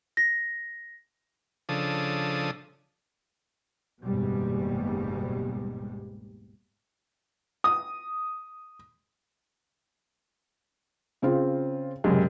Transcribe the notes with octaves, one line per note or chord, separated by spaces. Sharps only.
A#6
C#3 F3 D4 A4 D#6
F#1 D#2 G#2 B2 G3 G#3
D#6
C#3 C4 F4
F#1 F#2 C3 G#3